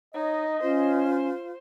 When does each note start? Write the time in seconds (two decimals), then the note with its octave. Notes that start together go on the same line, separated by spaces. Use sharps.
0.14 D#4 C#5 D#5
0.62 C#4 F4 C5